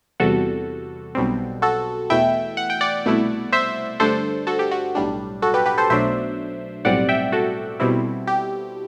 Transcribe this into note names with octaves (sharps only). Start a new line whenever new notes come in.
E2 C3 G3 F#4 A4
B1 B2 G3 C4
F#4 A4
E2 B2 A3 E4 E5 G5
F#5
G5
D5 F#5
C2 B2 A3 E4
C5 E5
G2 D3 A3 D4 A4 C5
F#4 A4
G4
F#4
B1 A2 G3 D4
F#4 A4
G4 B4
G4 B4
A4 C5
B1 B2 F#3 A3 D4 C5 E5
B1 A2 G3 C4 D5 F#5
E5 G5
F#4 A4
B2 G3 C4 E4
G4